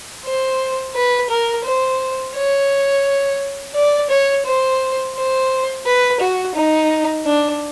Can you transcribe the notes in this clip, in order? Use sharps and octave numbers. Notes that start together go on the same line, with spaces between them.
C5
B4
A#4
C5
C#5
D5
C#5
C5
C5
B4
F#4
D#4
D4